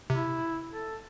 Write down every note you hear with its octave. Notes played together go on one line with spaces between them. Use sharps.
C3 E4
A4